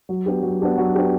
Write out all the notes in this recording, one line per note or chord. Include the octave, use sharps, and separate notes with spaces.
F#3
B3 D4 G4
F#3
B3 D4 G4
F#3
B3 D4 G4